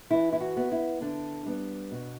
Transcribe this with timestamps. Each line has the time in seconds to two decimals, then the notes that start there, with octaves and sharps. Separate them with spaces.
0.11 E3 E4
0.33 E4
0.40 F#4
0.57 B3
0.72 E4
1.01 D3 D4
1.46 G3 B3
1.91 B2